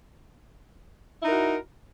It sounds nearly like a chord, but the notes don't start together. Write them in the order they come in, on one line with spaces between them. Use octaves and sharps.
E4 D#4 A#4 F#4